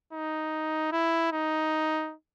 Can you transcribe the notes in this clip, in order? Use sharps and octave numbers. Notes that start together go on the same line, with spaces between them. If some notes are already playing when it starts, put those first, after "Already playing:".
D#4
E4
D#4